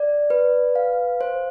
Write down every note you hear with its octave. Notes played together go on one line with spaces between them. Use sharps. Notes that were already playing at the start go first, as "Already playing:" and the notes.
Already playing: D5
B4
F5
C5